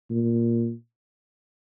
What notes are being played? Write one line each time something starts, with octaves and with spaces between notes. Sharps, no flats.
A#2